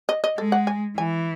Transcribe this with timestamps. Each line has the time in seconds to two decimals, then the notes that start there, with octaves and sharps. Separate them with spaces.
0.09 D#5
0.24 D#5
0.38 G#3 A4
0.52 F#5
0.67 G#5
0.97 E3 G#5